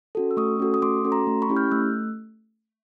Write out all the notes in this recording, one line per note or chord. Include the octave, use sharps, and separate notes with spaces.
C#4 F#4 A4
E6
A3 C#6 D#6
C#4 F#4 A4
D#6
A3 C6 D6
C#4 F#4 A4
A#5 C6
A3
B5 C#6
C#4 E4 G4
F6 G6
A3 E6 F#6